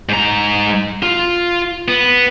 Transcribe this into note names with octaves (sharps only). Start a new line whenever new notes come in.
G#2 A#5
F4
B3